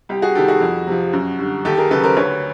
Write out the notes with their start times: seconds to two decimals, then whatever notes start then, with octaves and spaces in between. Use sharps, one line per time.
0.09 C2 G4
0.22 F#4 G#4
0.35 C3 D#3 G3 G4 A4
0.48 F#4 G#4
0.61 F2
0.87 C3 F3
1.13 F#2
1.39 D3 G3
1.65 D#2 G4 A4
1.77 G#4 A#4
1.91 C#3 F#3 A4 B4
2.04 A#4 C5
2.16 D2 B4 C#5